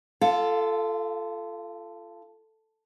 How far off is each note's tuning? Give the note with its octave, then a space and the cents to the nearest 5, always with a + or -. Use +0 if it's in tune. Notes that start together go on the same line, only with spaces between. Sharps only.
F4 -25 A4 +0 F5 +20